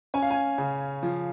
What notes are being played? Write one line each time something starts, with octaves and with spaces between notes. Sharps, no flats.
C#4 G#5
F5
G#5
C#3
F3